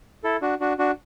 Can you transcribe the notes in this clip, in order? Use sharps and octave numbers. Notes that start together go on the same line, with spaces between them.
E4 A4
D4 F#4
D4 F#4
D4 F#4